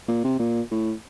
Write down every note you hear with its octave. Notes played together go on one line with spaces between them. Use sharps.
A#2
C3
A#2
A2